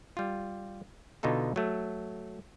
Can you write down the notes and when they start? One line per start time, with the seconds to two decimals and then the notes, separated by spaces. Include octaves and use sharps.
0.17 G3 F4
1.23 B2 D3 D#4 F4 A4
1.56 F#3 A3